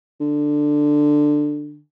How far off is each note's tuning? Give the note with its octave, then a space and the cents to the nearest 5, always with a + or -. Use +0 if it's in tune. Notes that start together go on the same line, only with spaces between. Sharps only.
D3 +10